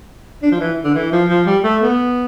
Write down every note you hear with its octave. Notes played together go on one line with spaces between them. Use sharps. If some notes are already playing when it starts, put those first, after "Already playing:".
D4
F3
E3
D3
E3
F3
F3
G3
A3
B3